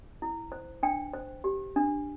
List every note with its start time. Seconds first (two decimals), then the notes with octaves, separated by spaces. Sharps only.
0.22 E4
0.52 C5
0.83 D4 G5
1.14 C5
1.44 G4
1.76 D4